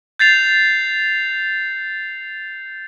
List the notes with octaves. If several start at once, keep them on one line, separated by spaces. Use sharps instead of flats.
G6 A6 C7 F7